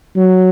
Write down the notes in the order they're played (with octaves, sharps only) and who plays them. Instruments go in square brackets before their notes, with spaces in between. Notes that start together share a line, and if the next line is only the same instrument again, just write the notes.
[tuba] F#3